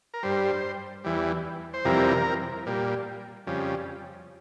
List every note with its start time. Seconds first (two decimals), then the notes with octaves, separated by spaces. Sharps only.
0.14 A#4
0.23 G2 G3 C5
1.04 E2 E3 G3
1.73 C5
1.85 F2 C3 E3 G3 A#4
2.66 A#2 G3
3.47 F2 C#3 G3